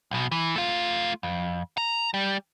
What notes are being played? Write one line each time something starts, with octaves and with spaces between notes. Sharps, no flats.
B1 B2
E3
A3 F4
F2
A#5
G3